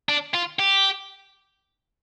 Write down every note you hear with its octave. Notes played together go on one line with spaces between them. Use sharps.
D4
F4
G4